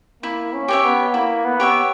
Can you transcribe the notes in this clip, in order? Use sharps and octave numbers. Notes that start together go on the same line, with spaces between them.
A#3 E4
C#4
G4 C#5 E5
B3
A#3 E4
B3
G4 C#5 E5